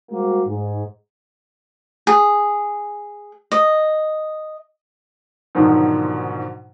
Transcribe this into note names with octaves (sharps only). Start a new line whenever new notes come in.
G3 G#3 A#3 C4 F#4
G#2
G#4
D#5
G#2 B2 D3 D#3 F3 F#3